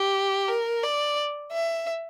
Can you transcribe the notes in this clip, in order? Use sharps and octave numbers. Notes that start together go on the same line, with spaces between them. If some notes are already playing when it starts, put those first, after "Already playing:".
Already playing: G4
A#4
D5
E5